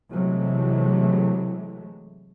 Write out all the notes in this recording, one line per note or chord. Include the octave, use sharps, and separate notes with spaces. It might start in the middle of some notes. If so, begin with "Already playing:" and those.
C3 E3 F#3 G#3 A3